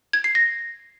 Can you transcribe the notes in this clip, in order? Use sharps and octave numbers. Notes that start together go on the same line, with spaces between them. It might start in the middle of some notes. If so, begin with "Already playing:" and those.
G#6
C7
A#6